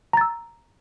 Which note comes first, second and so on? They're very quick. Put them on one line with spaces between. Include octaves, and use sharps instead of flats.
A#5 A6 E6